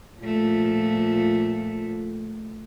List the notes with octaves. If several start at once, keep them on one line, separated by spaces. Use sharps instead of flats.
A#2 F3 A3